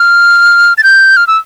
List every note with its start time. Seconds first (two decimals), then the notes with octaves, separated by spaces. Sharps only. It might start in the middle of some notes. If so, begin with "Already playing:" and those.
Already playing: F6
0.78 A6
0.83 G6
1.17 F6
1.27 E6